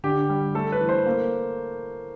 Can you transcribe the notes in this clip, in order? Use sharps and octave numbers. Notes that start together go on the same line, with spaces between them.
D3 G4
G3
A3 A4
B4
E3
C5
A#3